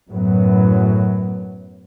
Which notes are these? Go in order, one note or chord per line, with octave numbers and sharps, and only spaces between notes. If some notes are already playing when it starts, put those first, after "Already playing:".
F#2 A2 F#3 B3